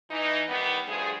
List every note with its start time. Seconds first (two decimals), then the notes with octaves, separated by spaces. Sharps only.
0.10 E3 D#4
0.49 D#3 G3 B3
0.87 G2 F3 A3 G#4